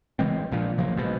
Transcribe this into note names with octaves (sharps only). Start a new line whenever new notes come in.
C#3 E3 G#3 C4
A#1 A#2 F3
C#3 F3 F#3 A#3
A#1 G#2 B2